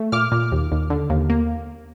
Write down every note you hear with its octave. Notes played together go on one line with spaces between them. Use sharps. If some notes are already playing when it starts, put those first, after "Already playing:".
Already playing: A3
A#2 D6 F6
A#2
D#2
D#2
D3
D#2
A#3